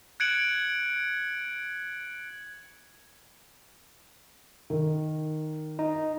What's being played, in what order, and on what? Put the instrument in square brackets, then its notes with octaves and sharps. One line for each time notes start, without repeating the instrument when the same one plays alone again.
[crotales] F#6 G#6 C#7 D7 F#7
[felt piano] D#3
[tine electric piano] D#4